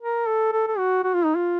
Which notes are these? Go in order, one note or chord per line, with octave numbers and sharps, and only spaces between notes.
A#4
A4
A4
A4
F#4
F#4
F4
D#4
F4